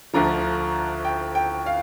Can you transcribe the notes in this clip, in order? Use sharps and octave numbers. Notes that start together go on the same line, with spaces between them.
D2 D3 F3 A#5
G5
G5
F5